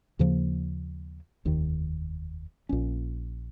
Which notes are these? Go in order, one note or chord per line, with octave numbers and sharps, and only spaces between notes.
D#2 C#3 F3 A#3
F1 D#2 D#3
A#1 A#2 G#3 C#4